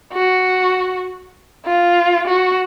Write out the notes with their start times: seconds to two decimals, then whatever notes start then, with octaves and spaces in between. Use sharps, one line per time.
0.13 F#4
1.65 F4
2.27 F#4